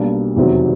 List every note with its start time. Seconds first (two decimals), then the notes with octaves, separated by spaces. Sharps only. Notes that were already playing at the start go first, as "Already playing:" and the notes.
Already playing: B1 B2 G3 A#3 D4
0.36 F1 E2 C3 D#3 F#3